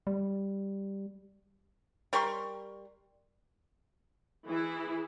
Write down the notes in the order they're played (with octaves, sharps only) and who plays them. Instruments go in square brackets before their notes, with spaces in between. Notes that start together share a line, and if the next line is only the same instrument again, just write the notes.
[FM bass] G3
[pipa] G3 A#4 C6 C#6
[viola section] E3 E4 G#4